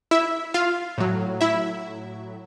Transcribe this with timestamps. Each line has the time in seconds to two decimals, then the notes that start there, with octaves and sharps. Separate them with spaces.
0.11 E4 E5
0.54 F4 F5
0.98 A2 F#3
1.41 E4 E5